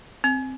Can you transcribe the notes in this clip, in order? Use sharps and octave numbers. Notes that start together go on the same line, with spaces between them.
C4